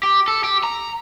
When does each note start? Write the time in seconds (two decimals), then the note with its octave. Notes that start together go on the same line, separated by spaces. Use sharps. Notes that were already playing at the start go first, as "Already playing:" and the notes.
0.03 G4
0.28 A4
0.44 G4
0.64 A#5